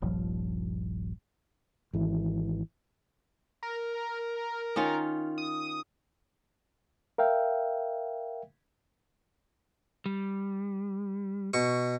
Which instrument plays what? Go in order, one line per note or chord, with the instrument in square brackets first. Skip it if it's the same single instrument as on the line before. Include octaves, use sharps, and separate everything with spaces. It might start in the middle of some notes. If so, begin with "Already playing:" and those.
[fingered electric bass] D#1 A#1 G2 F3
G#1 E3
[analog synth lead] A#4
[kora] D#3 C#4 F4
[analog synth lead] D#6
[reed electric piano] A#4 E5 F5 G5
[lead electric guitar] G3
[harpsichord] B2 C#6